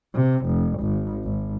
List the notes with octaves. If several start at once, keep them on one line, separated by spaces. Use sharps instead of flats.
C3
F1
G#1
G#1